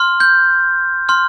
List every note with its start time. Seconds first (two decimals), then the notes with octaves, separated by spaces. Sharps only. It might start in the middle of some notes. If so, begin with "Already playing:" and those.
Already playing: C6 F6
0.20 G6
1.09 C6 F6